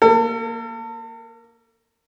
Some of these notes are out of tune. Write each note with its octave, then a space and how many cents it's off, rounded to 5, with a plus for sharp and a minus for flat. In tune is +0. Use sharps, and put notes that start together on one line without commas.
A#3 +0 A4 +40